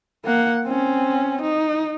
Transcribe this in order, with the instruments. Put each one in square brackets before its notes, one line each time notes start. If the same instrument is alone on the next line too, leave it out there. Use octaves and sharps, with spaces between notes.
[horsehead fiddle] A#3 F#5
C4 C#4
D#4